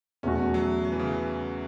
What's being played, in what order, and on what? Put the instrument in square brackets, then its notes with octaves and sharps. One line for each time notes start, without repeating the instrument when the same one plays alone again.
[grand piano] E2 B2 A3 F#4 [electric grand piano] C#4
[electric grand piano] F#3
F#3
E3
C#3
E3
C#3